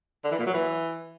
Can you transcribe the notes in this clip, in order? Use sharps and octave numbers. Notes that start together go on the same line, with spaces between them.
D3
E3
A#2
F#3
E3